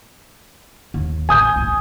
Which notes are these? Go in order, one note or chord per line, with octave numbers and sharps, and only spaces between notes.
D#2
A1 G#5 D#6 G6
F2 A2